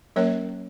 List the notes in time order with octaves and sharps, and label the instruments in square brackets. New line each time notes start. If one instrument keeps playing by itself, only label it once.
[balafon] F#3 A#3 C#4 A#4 C#5